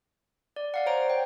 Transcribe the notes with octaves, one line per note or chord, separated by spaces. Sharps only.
D5
D5 F5 F#5
C5 C#5 A#5 D7
G5